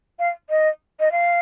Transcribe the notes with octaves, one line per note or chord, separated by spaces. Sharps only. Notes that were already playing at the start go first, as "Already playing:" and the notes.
F5
D#5
D#5
F5